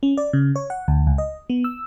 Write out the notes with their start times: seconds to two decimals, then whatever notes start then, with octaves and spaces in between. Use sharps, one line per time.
0.03 C#4
0.17 D5
0.33 C#3
0.56 C#5
0.70 F#5
0.88 D2
1.07 C#2
1.18 D#5
1.50 B3
1.64 E6